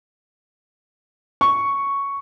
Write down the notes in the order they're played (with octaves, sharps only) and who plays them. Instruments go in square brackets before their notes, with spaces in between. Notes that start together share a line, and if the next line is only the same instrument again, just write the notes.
[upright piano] C#6